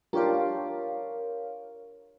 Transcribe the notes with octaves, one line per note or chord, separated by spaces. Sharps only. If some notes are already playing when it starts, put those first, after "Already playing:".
D4 F4 G4 A#4 C#5 F5